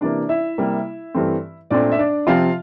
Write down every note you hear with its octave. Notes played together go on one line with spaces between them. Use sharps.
C3 E3 A#3 D4 D5
E4 E5
C3 G3 A#3
G2 E3 A3 C4
A#2 A3 C4 D4 D5
E5
D4 D5
C3 F3 C4 F4 F5